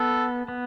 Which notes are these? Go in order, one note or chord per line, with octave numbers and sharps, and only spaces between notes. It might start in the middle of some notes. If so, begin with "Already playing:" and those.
Already playing: B3 A4
B3